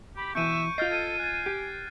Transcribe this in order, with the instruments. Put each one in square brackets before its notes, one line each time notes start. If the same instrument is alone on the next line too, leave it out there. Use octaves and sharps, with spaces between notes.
[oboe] G4 [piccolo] B5
[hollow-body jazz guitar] B2 E3 [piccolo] E5 [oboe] C#6 [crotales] G6 D7 D#7
[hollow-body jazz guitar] F4 D#5 [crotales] F6 A6 C7 [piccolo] G6
[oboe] A4 [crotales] G#6 [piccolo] D#7
[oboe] G#5 [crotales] F#6 A6
[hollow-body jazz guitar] G4